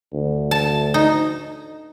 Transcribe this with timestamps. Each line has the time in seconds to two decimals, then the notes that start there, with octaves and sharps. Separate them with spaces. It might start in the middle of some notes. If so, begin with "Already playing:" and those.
0.12 D2
0.51 A5
0.94 D#4